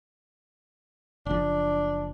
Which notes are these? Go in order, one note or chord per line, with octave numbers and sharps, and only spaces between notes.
F#1 F3 D4